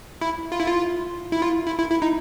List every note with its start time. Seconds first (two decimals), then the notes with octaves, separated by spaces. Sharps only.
0.21 E4
0.52 F4
0.60 E4
0.67 F4
1.32 E4
1.42 F4
1.66 E4
1.78 E4
1.91 E4
2.02 D#4